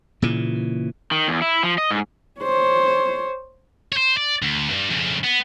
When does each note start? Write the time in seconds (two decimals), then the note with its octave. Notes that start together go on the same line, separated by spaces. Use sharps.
0.22 A#2 C#3 E3
1.11 D#3
1.28 E2
1.42 E4
1.63 F3
1.78 D#5
1.91 G#2
2.39 C5 C#5
3.92 C5 C#5
4.17 D5
4.42 D2
4.70 D2 G2
4.91 F2 C#3
5.24 B3